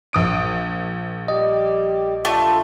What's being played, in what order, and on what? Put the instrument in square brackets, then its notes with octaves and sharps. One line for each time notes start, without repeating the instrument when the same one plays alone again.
[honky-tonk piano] A#1 D#6 D7
[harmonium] G3 G4 [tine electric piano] D#5
[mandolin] A3 [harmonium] D4 F4 E5